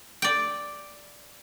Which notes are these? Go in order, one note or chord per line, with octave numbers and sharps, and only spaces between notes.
D5 G5